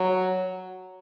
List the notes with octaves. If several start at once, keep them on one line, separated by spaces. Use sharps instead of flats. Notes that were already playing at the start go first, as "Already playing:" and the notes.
Already playing: F#3